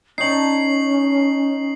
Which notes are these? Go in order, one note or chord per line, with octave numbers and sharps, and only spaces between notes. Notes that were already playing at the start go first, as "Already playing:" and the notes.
C#4 D#4 C#5 A5 C7 F#7